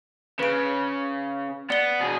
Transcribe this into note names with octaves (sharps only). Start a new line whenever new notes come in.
C#3 B4 D7
B3 D5 G7
B2 G#4